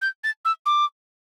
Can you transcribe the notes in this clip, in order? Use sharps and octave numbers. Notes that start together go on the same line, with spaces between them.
G6
A6
E6
D6